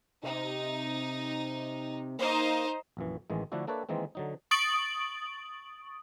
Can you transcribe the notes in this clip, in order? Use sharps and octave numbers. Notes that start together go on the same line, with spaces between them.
C3 D#4
A#3 D#4 C5
A#1 F#2 E3
A1 D#3 E3 G#3
D3 F3 A3 D4 E4 F#4
A#3 D4 A4 B4 C#5 E5
D#3 E3 G#3 A#3 C4
D3 F#3 D#4
C#6 D#6 A6 D7 F#7